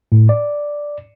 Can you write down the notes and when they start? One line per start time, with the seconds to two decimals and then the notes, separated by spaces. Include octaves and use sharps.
0.12 A2
0.29 D5